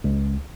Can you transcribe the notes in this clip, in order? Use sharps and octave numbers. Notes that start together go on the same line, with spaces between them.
C#2